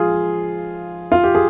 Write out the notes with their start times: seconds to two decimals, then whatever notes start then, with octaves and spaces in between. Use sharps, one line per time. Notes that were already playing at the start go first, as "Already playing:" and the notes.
Already playing: F3 G#3 F4 G#4
1.12 F4
1.23 G4
1.35 G#4